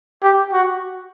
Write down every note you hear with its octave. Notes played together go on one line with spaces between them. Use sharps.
G4
F#4